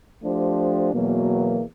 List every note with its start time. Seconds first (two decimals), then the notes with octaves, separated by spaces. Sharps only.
0.23 F3 A3 D4 G4 C5
0.92 E2 B2 F#3 A#3